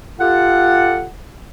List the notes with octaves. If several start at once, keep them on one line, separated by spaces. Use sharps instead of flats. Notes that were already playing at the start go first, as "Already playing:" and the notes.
F4 G4 A4 F#5